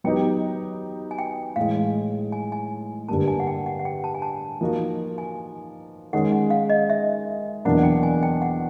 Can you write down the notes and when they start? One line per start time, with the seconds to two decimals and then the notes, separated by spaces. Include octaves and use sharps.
0.04 F#3 B3 D#4 G4 G5
1.11 G#5
1.19 G5
1.56 A2 E3 G#3 F5
2.32 G#5
2.52 G#5
3.08 G2 D3 G3 A#3 A5
3.28 G#5
3.40 F#5
3.47 G5
3.66 F#5
3.79 F#5
3.85 G5
4.04 A5
4.15 G#5
4.22 A5
4.61 F3 A#3 D#4 F#4
5.18 G#5
6.13 D#3 G#3 C#4 F#5
6.32 F#5
6.50 F5
6.70 D#5
6.90 E5
7.65 E2 B2 F#3 A#3 D4 F#5
7.79 F#5
7.83 G5
8.03 G#5
8.23 G5
8.42 F#5